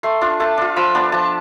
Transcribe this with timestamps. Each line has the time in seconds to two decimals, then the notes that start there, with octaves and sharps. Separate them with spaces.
0.03 A3 C6
0.21 D4 F4
0.40 A3 A5
0.58 D4 F4
0.76 F3 B5
0.95 B3 D4
1.12 F3 A5